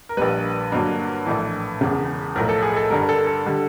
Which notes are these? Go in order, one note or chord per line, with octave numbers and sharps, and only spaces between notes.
A#4
A#1 A#2 G3 B4
G2 D3 F#3 A#3
A#1 A2 E3
E1 E2 C#3
B1 A2 F3 A#4
A4
G#4
A4
G2 D3 G3 A#4
A4
A4
D3 G3